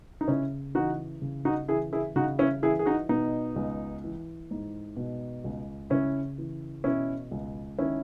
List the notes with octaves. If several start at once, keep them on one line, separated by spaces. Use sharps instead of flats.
D#4
C#3 C#4 E4
E3 D#4 F#4
C#3
D#4 F#4
E3 E4 G#4
E4 G#4
C#3 D#4 F#4
C#4 E4
E3 E4 G#4
G#4
D#4 F#4
B2 B3 D#4
C#2
E3
G#2
B2
C#2
C#3 C#4 E4
E3
B2 C#4 E4
C#2
D#3 C#4 E4